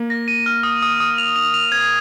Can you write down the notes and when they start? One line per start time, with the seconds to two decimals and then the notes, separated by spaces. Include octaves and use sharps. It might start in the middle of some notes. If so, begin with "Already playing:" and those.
Already playing: A#3
0.10 A#6
0.28 D#7
0.46 F6
0.63 D#6
0.83 D#6
1.00 D#6
1.18 F7
1.36 F7
1.54 F7
1.72 G#6